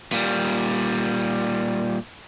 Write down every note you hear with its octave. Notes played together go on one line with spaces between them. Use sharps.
A#2 G3